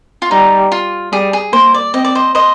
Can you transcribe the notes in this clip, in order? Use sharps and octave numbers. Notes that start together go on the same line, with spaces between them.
F4
G3 D#4
F4
G3 G#4
G#4
A#3 C5
D5
C4 D#5
D5
C5 D#5
C5 D#5